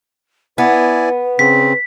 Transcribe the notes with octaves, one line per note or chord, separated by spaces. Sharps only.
B3 E4 B4 D5 G#5
C#3 C4 B6